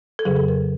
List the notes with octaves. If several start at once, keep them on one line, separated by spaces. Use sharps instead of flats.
A4
F2 C#3 F#3 G#4
A4
A#4